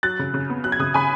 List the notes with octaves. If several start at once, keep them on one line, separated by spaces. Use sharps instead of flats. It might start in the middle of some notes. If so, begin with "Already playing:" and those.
F#3 F#6 A6
C#3
C#3
B3
F#3 F#6
G#6
C#3 D#6 F#6
C#3 G#5 B5